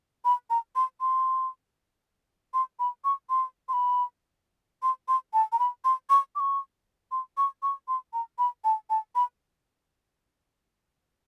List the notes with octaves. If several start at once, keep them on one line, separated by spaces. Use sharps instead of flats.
B5
A#5
C6
C6
C6
B5
C#6
C6
C6
B5
C6
C6
A5
A#5
B5
C6
C#6
D6
C#6
C6
C#6
C#6
C6
A#5
B5
A5
A5
B5